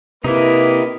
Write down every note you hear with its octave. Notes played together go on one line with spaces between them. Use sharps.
C3 A#3 D#4 E4 B4